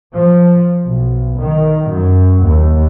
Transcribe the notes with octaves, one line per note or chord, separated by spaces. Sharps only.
F3
B1
D#3
F#2
D#2